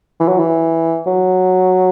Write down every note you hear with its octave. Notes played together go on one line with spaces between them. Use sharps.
E3
F#3
E3
F#3